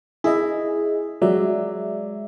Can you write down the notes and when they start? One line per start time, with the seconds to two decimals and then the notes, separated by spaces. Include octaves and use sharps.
0.24 E4 G#4 D#5
1.22 F#3 G#3 D5 E5